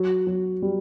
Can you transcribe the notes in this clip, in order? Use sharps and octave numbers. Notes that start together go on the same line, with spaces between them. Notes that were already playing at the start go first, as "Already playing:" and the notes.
Already playing: F#3
F#3
G3